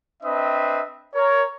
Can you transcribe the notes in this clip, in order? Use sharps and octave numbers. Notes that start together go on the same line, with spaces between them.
C4 D4 B4 D#5 E5 D#6
A#4 C#5